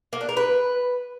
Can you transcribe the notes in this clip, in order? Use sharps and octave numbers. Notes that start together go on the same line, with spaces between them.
A#3
D4
A#4
B4